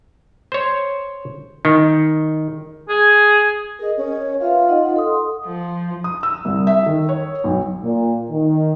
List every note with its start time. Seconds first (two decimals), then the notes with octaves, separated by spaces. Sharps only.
0.52 C5 C#5
1.65 D#3
2.89 G#4
3.79 G#4 A#4 D#5
3.97 C#4
4.40 F4 B4 E5 F5
4.69 D#4 D#5 F#5
4.96 A4 C6 D#6
5.45 F3
6.04 D#6
6.23 E6
6.45 C2
6.67 E5
6.86 D#3
7.09 C#5
7.44 B1
7.83 A#2
8.30 D#3